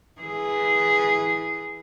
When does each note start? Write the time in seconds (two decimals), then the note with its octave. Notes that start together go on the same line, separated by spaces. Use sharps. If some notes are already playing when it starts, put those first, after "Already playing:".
0.21 E3 G#4